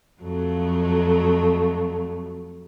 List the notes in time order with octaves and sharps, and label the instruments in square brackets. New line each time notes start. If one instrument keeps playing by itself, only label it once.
[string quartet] F2 F#3 A3